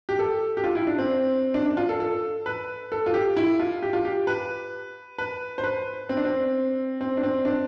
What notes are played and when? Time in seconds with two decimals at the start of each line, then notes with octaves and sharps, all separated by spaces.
0.09 G4
0.19 A4
0.57 G4
0.64 F4
0.75 E4
0.87 D4
0.99 C4
1.54 D4
1.66 D4
1.77 F4
1.89 A4
2.00 A4
2.46 B4
2.92 A4
3.06 F4
3.14 G4
3.37 E4
3.60 F4
3.83 G4
3.93 F4
4.05 G4
4.27 B4
5.18 B4
5.58 C5
5.64 B4
6.09 C4
6.17 D4
6.25 C4
7.01 C4
7.17 D4
7.23 C4
7.45 D4